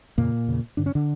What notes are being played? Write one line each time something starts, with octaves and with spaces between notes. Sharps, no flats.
F2 A#2 C#3 A#3
E2 C#3
G2 D3 D4
C#4
D3 D4